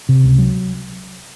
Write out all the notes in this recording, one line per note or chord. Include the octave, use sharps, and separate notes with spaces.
C3
C#2
F#3